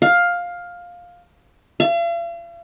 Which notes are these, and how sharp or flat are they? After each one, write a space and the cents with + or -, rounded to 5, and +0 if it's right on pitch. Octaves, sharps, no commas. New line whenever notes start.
F5 +10
F5 -45